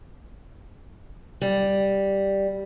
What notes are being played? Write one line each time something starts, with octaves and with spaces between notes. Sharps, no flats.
G3